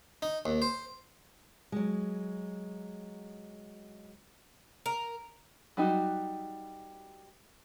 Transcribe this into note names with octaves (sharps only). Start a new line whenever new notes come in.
D#4
D#2
C5
F#3 G#3
A#4
F#3 G3 D#4 F4 F#4